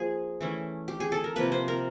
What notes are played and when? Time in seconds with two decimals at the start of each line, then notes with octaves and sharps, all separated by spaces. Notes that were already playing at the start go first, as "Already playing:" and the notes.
Already playing: F3 A#3 G#4
0.41 E3 A3 C#4
0.88 G4
1.00 G#4
1.12 A4
1.24 A#4
1.36 C3 F3 A#3 B4
1.52 C5
1.68 A#4